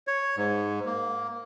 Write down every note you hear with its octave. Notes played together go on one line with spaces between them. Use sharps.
C#5
G#2
A#3